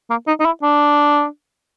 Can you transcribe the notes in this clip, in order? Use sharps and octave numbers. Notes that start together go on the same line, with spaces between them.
A#3
D#4
D#4
E4
D4